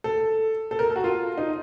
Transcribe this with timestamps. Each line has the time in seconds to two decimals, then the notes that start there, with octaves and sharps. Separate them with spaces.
0.04 A4
0.71 A4
0.79 A#4
0.90 A4
0.96 F#4
1.04 F4
1.38 D#4